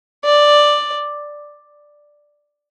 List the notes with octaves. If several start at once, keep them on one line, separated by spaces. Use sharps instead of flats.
D5